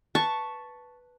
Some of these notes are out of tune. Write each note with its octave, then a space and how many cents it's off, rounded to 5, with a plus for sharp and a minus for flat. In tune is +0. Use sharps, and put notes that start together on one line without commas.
B4 +0 A5 +0 C#6 +0